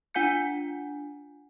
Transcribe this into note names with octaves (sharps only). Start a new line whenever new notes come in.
D4 F4 F#5 G#5 G6 C#7